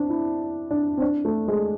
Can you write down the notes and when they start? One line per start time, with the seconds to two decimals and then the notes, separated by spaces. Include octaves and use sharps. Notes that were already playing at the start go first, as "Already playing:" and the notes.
Already playing: C4 D4
0.10 E4
0.71 D4
0.97 C4
1.02 D4
1.25 A3
1.48 G#3